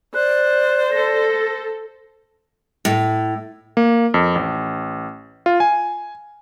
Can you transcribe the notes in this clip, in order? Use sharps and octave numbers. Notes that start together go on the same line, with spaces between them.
C5 D5 F#6
A4 A#6
A2
A#3
F2
A1
F4
G#5